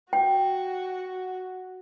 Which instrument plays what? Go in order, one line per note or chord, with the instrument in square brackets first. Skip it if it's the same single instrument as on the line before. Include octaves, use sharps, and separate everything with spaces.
[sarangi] F#4 [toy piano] G5